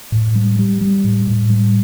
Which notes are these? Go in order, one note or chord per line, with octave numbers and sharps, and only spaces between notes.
A2
G3
G3
G3
A2
A2
G3